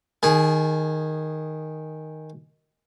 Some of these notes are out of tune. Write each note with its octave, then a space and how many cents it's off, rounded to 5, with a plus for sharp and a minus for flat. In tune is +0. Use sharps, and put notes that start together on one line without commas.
D#3 +0 G#4 -10 G#5 +40